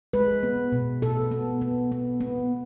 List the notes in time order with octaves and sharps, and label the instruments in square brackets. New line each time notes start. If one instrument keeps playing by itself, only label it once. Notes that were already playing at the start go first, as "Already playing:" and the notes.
[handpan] G#3 B4
B3
B2
B2 A4
B3
B3
B3
B3